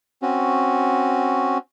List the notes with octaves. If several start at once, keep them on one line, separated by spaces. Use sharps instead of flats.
C4 C#4 F#4